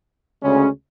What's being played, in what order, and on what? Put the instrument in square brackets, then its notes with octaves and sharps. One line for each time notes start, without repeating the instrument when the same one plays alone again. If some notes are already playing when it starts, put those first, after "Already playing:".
[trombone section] D2 C#3 G#3 C#4